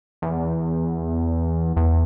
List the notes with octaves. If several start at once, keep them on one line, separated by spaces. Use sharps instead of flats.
E2
E2